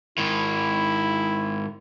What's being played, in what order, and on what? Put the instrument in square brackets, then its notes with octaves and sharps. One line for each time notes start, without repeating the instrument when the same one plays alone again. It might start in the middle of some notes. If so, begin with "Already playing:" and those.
[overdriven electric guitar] G#2 D#3 [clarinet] E4